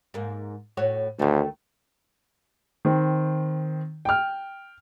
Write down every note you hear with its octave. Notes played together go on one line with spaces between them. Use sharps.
G#2 A#3
A2 F#4 C#5
D2 D#3 A3
D#3 C4
G5 F6